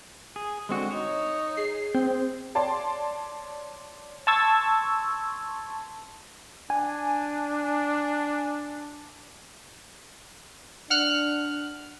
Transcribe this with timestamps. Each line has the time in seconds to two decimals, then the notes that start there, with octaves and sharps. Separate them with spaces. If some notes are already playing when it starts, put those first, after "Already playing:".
0.36 G#4
0.69 D3 G#3 C4 F#4
0.91 D#4 C#5
1.57 G#4 C7
1.95 C4 G6
2.55 C#5 D5 A5 C6
4.27 A5 C6 C#6 E6 G#6 A6
6.70 D4 G#5
10.90 D4 F#5 F6 F#6